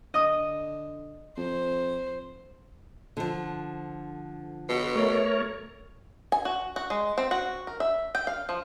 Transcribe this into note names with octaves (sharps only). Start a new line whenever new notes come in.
D3 D#5 D#6
F2 C5
D3 F3
B2
A3 A#4 C#5
G#5
F#4
F#4
G#3
C4
F#4
A#4
E5
G5
F5
F3